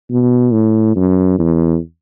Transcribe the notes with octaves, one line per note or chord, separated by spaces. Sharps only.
B2
A2
F#2
E2